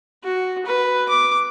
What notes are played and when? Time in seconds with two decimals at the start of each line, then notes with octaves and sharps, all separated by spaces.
0.23 F#4
0.66 B4
1.08 D6